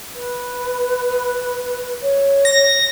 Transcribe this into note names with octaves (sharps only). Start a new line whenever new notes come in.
B4
C#5
A#6